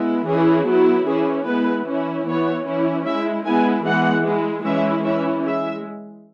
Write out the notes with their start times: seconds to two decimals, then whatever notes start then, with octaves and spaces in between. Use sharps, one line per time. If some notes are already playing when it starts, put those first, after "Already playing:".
Already playing: G#3 B3 E4
0.27 E3 C#4 E4 G#4
0.67 F#3 B3 E4
1.06 E3 C#4 E4 G#4
1.47 G#3 B3 E4 B4
1.87 E3 C#4 E4
2.26 E3 B3 E4 C#5
2.66 E3 C#4 E4
3.06 G#3 E4 E5
3.45 G#3 B3 E4 G#5
3.85 E3 G#3 B3 F#5
4.25 G#3 E4
4.65 E3 G#3 C#4 E4 E5
5.05 E3 C#4 E4 E5
5.45 G#3 E5